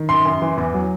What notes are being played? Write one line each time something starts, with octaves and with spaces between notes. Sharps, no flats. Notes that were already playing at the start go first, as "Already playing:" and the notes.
Already playing: D#3
F#2 C6
F#2
E3
E2
F#3